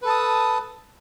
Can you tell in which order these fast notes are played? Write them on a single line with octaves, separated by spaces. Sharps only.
B4 A4 A5 D#6